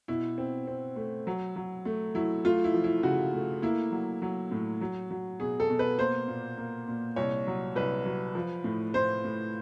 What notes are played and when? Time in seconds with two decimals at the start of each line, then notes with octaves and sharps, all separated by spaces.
0.08 B2 E4
0.38 C4
0.67 C4
0.96 A3
1.27 F#3
1.56 F#3
1.85 A3
2.15 F#3 E4
2.45 A3 F4
2.64 E4
2.74 F3
2.84 E4
3.03 C#3 F#4
3.34 A3
3.62 A#3 E4
3.92 F#3
4.22 F#3
4.51 A2
4.81 F#3
5.11 F#3
5.40 B2 G#4
5.60 A4
5.70 B2
5.79 B4
5.98 A#3 C5
6.28 A#2
6.57 A#3
6.88 A#2
7.16 C2 C#5
7.47 F#3
7.76 C2 B4
8.05 F#3
8.35 F3
8.64 A2
8.94 A2 C5
9.24 A2